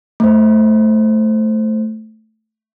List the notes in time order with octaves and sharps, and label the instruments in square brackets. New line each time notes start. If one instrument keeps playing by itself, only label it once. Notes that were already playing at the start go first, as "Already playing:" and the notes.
[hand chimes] A3 C5